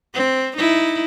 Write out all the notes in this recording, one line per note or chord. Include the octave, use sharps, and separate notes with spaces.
C4
D#4 E4